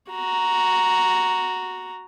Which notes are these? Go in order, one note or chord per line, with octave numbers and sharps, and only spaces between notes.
F#4 A#5